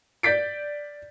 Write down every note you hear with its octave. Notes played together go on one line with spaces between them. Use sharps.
D5 G6 A6 B6 D7